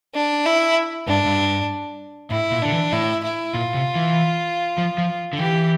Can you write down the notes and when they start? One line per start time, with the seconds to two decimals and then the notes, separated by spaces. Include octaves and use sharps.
0.15 D4
0.46 E4
1.08 G2 D4
1.26 G2
2.30 A2 E4
2.52 A#2
2.62 D3 D4
2.72 E3
2.92 A2 E4
3.23 E4
3.54 A#2 F4
3.74 C3
3.96 E3
4.78 F3
4.98 F3
5.33 D3
5.39 E3 G4